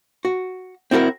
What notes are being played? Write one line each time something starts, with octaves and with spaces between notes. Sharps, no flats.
F#4
C4 E4 F#4 A4 A#4